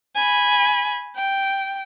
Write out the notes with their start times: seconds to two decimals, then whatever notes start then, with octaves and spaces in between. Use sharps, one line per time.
0.15 G#5 B5
1.16 G5